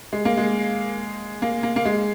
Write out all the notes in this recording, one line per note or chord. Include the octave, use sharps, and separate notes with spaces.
G#3
A#3
G#3
A#3
A#3
A#3
G#3